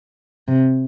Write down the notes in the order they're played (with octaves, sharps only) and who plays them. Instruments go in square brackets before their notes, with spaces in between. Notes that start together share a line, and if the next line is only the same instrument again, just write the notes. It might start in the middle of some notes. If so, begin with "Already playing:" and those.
[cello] C3